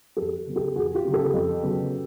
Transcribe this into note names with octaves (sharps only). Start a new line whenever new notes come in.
F2 G4 A4
C#3 F#3 B3
G4 A4
F2 F#4 G#4
F4 G4
C#3 F#3 B3
G4 A4
F2
C#3 F#3 B3